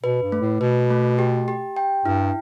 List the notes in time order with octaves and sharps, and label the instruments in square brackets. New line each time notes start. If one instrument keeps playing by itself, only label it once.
[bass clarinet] B2 [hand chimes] B4
[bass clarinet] G2
[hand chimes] A3
[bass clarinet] A2
[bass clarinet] B2 [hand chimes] B4
[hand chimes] A3
G4
G4
G5
[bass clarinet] G2 [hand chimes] E4